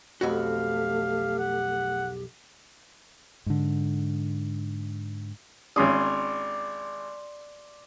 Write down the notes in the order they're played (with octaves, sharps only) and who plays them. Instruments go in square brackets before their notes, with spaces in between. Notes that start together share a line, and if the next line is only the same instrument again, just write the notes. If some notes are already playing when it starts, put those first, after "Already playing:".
[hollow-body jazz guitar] B1 F2 F#4 [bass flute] A3 [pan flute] G4 [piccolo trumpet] F5
[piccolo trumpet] F#5
[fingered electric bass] G#2 D3
[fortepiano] G#1 C#4 D#6 [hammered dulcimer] D5 C6